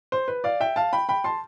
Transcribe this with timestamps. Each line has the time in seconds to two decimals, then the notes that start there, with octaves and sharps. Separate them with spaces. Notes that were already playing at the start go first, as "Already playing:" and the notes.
0.12 C5
0.28 B4
0.44 D5 F5
0.60 E5 G5
0.76 F5 A5
0.93 G5 B5
1.09 G5 B5
1.24 A5 C6